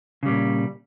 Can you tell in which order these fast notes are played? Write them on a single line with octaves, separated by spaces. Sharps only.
C#3 G3 A#2